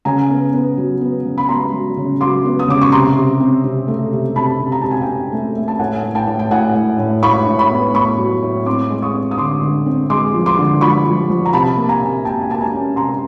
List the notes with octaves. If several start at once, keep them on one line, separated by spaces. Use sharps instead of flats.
C#3 G#5 A#5
B3
B3
F#3
B3
C#3
B5
B3 A#5 C6
F#3
C#3
F#3 C6 D6
B3
D#6
C#3 D6
C#6
C3 A#5 C6
C3
C4
C3
A3
C3
C3 A5 B5
C3
A#5
C3 A5
G#5
G5 A5
C4
A3
A3
A5
A2 F#5 G#5
A2
G5 A5
A2
G5
A2 F#5 G#5
A2
A2
A2 B5 C#6
A2
B5 C#6
B3
A2 B5 C#6
F#3
A2
C4 C6 D6
G#3
C#6 D#6
C4
D#6
D3 C6 D6
D3
C4
G#3 C6 D6
F3
C6 D6
D3
F3 B5 C#6
F3
F3
A#5
C3 A5 B5
A#3
G#5 A#5
C3
A#3 G5 A5
G#5
A#3 A5
G#5 A#5
C#4
C3 A#5 C6